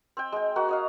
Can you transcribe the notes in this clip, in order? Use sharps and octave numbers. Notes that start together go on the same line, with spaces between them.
C4 G5
G#3 G5
A#3 F#4 F#5
C#5 D#5 F5